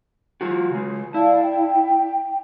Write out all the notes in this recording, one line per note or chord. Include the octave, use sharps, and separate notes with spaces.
F#3 F4 F#4
C#3 G#3
E4 D5 F5 A5
G5